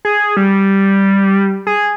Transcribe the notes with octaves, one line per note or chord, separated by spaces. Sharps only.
G#4
G3
G#4